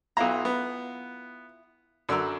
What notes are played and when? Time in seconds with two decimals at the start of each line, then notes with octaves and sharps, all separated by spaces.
0.17 B1 E4 F4 F#5 A#5
0.45 B3
2.09 F#2 D3 A#4 B4 C6 E6